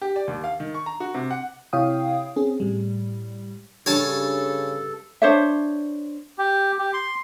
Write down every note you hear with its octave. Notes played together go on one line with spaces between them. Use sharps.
G4
D5
D#2
F5
D#3
C#6
A#5
F#4
C3
F#5
C3 E4 C#5 F5 G5 D#6
C4 C#4 G#4
A2 G3
G2 C#3 A4 C#5 G#5 A5
D4 C5 C#5 E5
G4
G4
C6